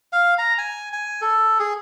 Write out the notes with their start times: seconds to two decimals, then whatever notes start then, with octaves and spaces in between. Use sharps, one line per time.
0.13 F5
0.38 A#5
0.58 G#5
0.93 G#5
1.21 A4
1.59 G#4